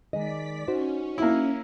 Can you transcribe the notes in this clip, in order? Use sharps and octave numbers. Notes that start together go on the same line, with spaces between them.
D#3 G#3 D5 D#5 B6
C#4 D#4 F#4 C5
A#3 E4